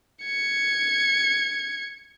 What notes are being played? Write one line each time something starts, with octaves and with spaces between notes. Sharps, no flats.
G#6 C#7